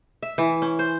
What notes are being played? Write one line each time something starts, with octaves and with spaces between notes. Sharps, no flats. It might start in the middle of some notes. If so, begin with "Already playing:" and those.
E5
E3
C#4
C5